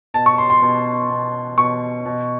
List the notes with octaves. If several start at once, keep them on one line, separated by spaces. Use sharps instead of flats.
B2 A5
C#6
C6
C6
B2
B2
B2 C#6
B2